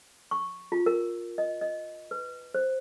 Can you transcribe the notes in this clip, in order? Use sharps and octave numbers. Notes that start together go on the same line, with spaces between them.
C#6
F4
A#4
D#5
D#5
B4
C5